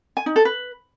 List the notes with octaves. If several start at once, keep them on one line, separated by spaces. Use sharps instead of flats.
G#5
D#4
A4
B4